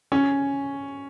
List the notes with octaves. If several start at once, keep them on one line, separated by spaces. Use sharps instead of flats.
C#4